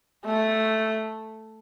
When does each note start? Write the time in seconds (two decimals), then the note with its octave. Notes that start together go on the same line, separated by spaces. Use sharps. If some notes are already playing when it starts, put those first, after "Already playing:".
0.25 A3